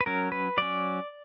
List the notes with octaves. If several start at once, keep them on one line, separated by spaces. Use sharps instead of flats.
B4
F#3 C#4 A#4
B4
F#3 C#4 D5